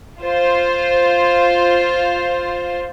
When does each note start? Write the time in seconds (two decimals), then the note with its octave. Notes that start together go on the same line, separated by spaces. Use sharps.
0.20 F4 C5